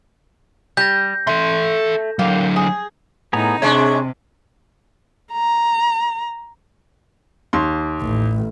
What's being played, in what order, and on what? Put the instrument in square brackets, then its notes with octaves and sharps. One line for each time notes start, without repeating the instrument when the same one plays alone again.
[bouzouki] G3 [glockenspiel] G6 A#6
[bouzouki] A3 [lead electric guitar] A4 C6
[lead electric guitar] D3 F#3 [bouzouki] A#3 G4
[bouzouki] G#4
[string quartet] A2 D#4 [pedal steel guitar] B3 G#4 A#5
[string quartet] C3 [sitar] G#3 D4 [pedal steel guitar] C#5 E5 C#6
[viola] A#5
[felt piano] D#2 C6
[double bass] A1